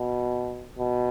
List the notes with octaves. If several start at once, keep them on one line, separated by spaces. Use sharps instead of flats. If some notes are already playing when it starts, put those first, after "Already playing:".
Already playing: B2
B2